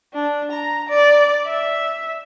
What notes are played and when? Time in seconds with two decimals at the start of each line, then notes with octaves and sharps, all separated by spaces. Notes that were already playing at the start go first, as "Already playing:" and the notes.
0.14 D4
0.52 A#5
0.89 D5
1.47 E5